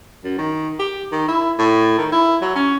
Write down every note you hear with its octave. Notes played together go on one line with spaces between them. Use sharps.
F#2
D#3
G4
D#3
E4
A2
D#3
E4
F#3
C#4